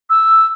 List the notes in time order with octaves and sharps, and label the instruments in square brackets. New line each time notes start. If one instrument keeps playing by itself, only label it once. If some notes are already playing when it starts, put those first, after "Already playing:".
[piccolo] E6